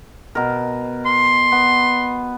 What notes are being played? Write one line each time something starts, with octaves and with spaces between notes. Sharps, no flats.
B2 A#4
C6
B3